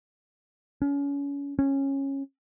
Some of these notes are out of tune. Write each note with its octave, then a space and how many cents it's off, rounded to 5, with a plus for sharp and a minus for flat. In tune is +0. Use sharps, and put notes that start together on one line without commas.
C#4 +30
C#4 -15